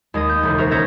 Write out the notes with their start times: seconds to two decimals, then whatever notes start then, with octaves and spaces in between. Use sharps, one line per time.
0.14 D#2 G#3 D#5 D#6
0.28 A#3 G6
0.43 E1 C#2 E4
0.58 F#4 G#4 A#4 C5 E5
0.71 D#3 C#4 E5 G6 G#6 A#6